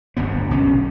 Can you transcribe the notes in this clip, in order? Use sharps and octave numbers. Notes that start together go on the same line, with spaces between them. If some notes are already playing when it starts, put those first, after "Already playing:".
D1 G1 G2 B3
B1 F#2 C3 C#4